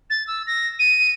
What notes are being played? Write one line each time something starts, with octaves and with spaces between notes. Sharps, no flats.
A6
E6
A#6
D#7